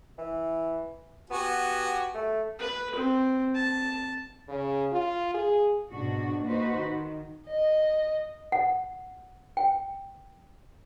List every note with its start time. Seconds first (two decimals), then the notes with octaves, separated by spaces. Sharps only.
0.18 E3
1.30 B3 F#4 G4 G#5
2.14 A3
2.59 B4
2.95 C4
3.56 A5
4.48 C#3
4.92 F4
5.34 G#4
5.90 G#2 B2 D4 F#4
6.45 A#3 D#4 F#4 B4 C5
6.78 D#3
7.48 D#5
8.52 F#5
9.57 G5